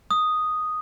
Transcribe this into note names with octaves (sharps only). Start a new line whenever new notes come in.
D#6